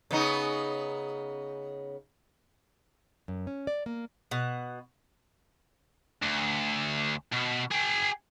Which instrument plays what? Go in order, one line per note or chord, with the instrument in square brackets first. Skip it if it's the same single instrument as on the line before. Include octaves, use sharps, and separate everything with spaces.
[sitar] C#3 B3 D#4
[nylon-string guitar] F#2
C#4
D5
A#3
[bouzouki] B2 F#5
[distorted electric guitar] D2
B2
G#4 G5